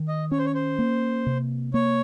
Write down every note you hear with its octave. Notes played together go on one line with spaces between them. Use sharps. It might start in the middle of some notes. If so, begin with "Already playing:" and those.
Already playing: D#3
D#5
C#4 C#5
C5
C#5
C5
A#3
C3
A#3 C#5